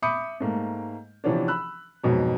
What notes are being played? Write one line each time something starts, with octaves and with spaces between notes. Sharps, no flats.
E5 B5 D6 D#6 G6 C#7
G#2 A3 A#3
C3 E3 F3 B3 C#4 D4
B5 E6 F#6
F2 G#2 B2 F#3